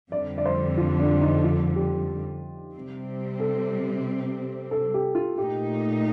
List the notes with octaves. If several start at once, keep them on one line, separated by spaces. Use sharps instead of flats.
F2 D3 G3 D5
D5
C5
F4
D4
D#4
F4
G4
C3 G3 C4
A4
A4
G4
F4
A#2 A3 D#4 G4